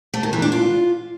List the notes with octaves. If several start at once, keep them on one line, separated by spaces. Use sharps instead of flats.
A3
D#3
E3
D4
F4